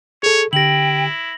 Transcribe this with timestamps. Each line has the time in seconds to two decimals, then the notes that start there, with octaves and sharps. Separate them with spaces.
0.23 G#4 A4 C#5
0.53 D3 E4 G4 G5 A#6 F#7